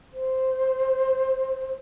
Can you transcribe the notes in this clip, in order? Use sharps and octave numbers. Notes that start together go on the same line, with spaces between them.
C5